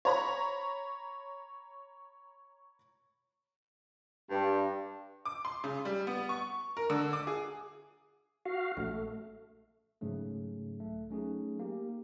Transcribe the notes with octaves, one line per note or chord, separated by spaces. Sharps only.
C#5 A#5 B5
G2
D6
C6
C#3
G3
B3
C#6
A#4
D3
D6
G#4
F#4 F5
A#1 A3
G#2 C#3 F#3 A3
B1 A3
F#3 A3 C#4 D#4 G#4
A#3 G4